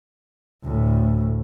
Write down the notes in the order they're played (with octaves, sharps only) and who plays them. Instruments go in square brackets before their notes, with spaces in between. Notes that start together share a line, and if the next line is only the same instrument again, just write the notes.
[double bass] D2 A2